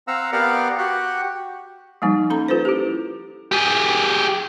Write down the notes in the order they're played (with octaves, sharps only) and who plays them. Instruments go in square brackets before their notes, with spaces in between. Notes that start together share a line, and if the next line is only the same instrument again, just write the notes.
[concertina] C4 F5 F#5 A#5 E6
B3 G4 A#4 D5 F5 F#5
F#4 G4 F#5
[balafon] F3 G3 A#3 D#4
C#4 A4 A#5
F4 A4 B4 C5
E4 G4
[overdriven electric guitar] G4 G#4